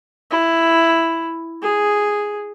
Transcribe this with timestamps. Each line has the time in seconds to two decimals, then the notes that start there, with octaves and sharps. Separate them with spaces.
0.31 E4
1.62 G#4